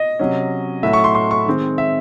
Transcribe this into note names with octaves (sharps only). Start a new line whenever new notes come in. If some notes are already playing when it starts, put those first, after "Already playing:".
Already playing: D#5
C3 F#3 C#4
A2 F#3 A3 E5
C#6
C6
C6
C#6
D#3 G#3 C4
E5